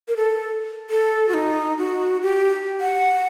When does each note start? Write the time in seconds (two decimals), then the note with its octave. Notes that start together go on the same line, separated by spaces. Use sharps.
0.08 A#4
0.17 A4
0.90 A4
1.29 F#4
1.34 D#4
1.78 F#4
2.22 G4
2.81 F#5